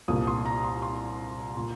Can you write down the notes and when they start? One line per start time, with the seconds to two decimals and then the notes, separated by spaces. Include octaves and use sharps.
0.08 C2 A#2 A#3 D#6
0.27 C6
0.45 A#5
0.64 C6
0.82 C6
1.56 A#2 A#3 C6